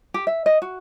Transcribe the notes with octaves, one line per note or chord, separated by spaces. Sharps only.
G4
E5
D#5
F#4